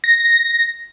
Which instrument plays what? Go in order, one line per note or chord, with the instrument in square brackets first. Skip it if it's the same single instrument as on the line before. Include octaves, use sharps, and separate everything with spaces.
[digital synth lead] A#6